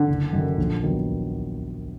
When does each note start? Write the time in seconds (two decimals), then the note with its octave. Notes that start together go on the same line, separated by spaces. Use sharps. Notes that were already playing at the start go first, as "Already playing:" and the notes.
Already playing: D3
0.08 F#1
0.33 F#2 D#3
0.58 A#1
0.83 D#3 F#3 B3